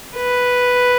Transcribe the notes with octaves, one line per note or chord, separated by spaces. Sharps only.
B4